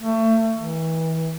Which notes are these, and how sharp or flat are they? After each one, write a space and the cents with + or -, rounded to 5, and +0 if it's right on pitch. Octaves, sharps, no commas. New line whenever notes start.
A3 +30
E3 -30